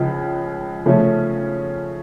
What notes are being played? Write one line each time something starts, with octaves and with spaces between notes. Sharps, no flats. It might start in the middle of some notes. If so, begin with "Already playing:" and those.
Already playing: C#2 C#3 F3
C#3 F3 A3 C#4